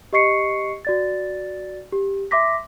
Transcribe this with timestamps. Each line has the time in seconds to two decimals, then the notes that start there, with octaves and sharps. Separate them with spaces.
0.13 G4 D#5 C#6 C7 C#7
0.85 F#4 D5 A6
1.92 G4
2.31 E5 C6 D6 A#6 B6